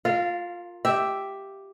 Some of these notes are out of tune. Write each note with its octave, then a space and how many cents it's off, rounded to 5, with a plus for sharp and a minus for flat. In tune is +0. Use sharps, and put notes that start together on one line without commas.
F4 +10 A#4 -25 F5 -20
G4 +0 E5 +0